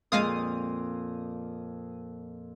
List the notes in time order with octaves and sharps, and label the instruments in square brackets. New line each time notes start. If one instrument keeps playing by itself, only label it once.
[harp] F2 A#2 [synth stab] G#3 F5 D#6